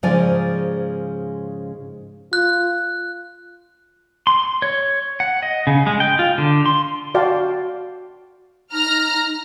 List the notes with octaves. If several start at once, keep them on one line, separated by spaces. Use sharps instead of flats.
G#2 C#3 F3 G#3 D5 G#5
F4 F#6
C6
C#5
F#5
D#5
C#3
G#3
G5
F4
D3
C6
F#4 D5 F5 G5 A5 C6
D#4 A#5 F6